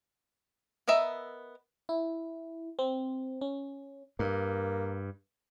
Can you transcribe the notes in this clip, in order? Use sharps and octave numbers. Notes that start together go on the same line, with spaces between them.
B3 A#4 D#5 E5 A#5
E4
C4
C#4
G2 A#3